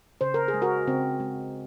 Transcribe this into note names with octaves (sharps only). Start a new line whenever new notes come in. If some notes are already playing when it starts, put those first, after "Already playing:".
C#3 C5
A#4
G#4
G#3
F#4 A#4
C#3 C4
G#3